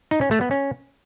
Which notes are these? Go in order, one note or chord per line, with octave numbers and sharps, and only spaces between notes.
D#4
C#4
A3
B3
C#4